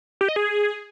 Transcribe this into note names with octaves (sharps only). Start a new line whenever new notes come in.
G4
D#5
G#4